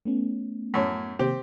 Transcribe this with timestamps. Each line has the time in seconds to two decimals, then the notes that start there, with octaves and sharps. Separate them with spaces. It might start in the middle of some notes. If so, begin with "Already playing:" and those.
0.05 A3 B3 C#4
0.74 F#2 A2 C#5
1.19 C3 D#3 A#3 C4 G4